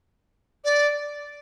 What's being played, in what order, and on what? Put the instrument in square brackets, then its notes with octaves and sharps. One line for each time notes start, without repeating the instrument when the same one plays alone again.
[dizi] D5